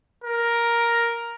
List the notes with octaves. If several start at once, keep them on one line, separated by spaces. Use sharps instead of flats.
A#4